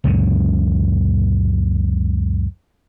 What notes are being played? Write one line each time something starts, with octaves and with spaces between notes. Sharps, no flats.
C#2 F#2 A#2 D3